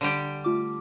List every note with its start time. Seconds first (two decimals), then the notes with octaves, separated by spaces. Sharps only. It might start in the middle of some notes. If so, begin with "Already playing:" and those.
0.01 D3 G3 G4
0.44 A3 F4 D6